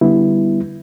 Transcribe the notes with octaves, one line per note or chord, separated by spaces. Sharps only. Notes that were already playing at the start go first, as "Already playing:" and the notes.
D3 G3 B3 E4